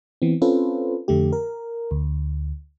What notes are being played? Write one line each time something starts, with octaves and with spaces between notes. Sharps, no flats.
E3 B3 C4
C4 C#4 F4 A4 B4 C5
F2 D3 A3 G4
A#4
D2